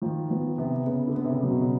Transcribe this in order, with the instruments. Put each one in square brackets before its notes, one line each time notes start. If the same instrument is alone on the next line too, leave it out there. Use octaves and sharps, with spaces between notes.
[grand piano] D#3 [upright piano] F3
[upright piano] F3 [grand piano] B3
[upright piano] C3 [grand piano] B3
[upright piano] C#3 [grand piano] B3
[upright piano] D3
[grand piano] B3
[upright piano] C3
C#3
[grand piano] F#3
[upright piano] B2
C#3